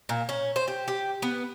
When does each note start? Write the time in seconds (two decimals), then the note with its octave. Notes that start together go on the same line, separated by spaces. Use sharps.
0.09 A#2
0.29 C#4
0.56 C5
0.68 G4
0.88 G4
1.22 B3